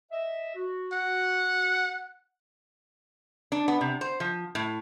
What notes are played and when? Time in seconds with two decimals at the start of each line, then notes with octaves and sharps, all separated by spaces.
0.11 D#5 E5
0.55 F#4
0.93 F#5
3.52 D4
3.68 B3
3.81 C3
4.01 C5
4.20 F3
4.55 A2